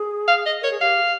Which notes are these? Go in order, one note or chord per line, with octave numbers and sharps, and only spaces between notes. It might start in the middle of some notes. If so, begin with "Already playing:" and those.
Already playing: G#4
F5
D#5
A#4 C#5
G#4
G4 F5